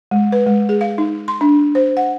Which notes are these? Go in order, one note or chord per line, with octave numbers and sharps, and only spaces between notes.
G#3
B4
G#3
G#4
F5
D#4
C6
D4
C5
F#5